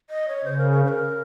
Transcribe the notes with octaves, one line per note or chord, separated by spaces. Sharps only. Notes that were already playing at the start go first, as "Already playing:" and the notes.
D#5
C#5
C#3 C5
A#4
A#4
C5
A#4